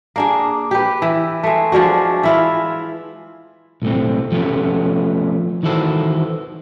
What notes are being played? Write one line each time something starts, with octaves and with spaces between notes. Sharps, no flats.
A#3 D4 G#4
G4 B4
E3
G#3 A3
F3 G#3 D4 F#4
E3 E4 F4
B1 A2 A3 C4
F3 A3 B3 C#4
D#3 E3 E4 F#4 A4 C5